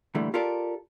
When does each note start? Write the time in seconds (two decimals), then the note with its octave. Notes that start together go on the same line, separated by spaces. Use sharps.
0.15 A#2 D3 E3 G3 A3
0.34 F4 G4 A4 A#4 D5